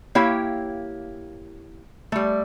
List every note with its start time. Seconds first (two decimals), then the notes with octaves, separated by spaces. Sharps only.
0.15 A#3 E4 G4 C#5 F5 G5
2.12 G3 A3